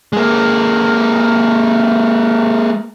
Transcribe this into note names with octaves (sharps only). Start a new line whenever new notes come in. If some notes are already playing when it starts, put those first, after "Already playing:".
G#3 A#3